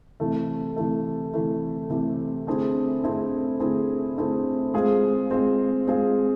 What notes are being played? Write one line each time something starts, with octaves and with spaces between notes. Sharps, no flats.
C3 E3 A3
C3 E3 A3
C3 E3 A3
C3 E3 A3
D3 A3 C4 E4 G#4
D3 A3 C4 E4 G#4
D3 A3 C4 E4 G#4
D3 A3 C4 E4 G#4
G#3 C4 F4 G#4
G#3 C4 F4 G#4
G#3 C4 F4 G#4